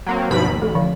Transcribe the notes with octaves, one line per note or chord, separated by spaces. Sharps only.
F#3 A#3 C4 A#5
G2 B2 F3 D#4 C5 B5
D#2
A1 A4
D3 F3 F5